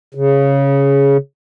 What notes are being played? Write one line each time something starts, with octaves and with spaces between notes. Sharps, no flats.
C#3